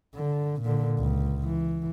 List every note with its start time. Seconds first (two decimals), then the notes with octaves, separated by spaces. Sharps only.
0.15 D3
0.62 A#2 D3
0.99 C#2
1.44 E3